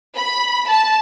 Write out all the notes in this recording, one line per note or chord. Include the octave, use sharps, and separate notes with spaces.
B5
A5